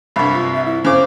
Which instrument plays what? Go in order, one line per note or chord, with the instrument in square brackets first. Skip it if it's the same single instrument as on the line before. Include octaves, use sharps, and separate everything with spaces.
[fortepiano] C2 G2 [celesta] B5
[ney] F4
E5
E4
[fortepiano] C#3 D6 [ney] C5